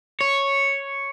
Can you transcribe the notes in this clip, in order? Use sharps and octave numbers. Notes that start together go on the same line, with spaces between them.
C#5